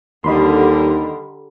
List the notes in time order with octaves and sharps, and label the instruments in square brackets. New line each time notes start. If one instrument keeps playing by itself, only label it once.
[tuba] D#2 [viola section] D3 G3 A#4 [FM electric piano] D#5 B5 C6